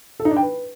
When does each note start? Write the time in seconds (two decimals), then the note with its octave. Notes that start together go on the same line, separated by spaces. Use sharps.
0.20 A4
0.25 D#4
0.31 D4
0.37 G5
0.42 B4